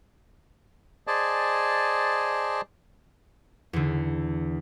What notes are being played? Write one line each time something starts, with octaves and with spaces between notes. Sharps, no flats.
G#4 C5 D5 D#5 G#5 A5
E2 D3